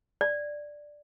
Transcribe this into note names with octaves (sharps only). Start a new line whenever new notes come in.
D5